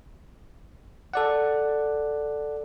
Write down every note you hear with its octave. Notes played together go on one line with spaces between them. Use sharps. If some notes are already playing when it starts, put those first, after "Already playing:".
A4 D5 F#5